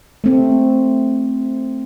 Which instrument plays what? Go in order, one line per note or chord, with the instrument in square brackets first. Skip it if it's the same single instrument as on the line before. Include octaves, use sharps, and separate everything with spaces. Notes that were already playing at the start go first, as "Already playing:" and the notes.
[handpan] A3 C4